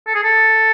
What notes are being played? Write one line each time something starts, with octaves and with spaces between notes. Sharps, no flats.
A4
G#4
A4